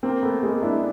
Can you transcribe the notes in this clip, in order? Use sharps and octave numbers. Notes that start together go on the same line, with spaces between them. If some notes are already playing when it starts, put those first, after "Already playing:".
A#3 C4
A3 B3
G#3 A#3
D4 E4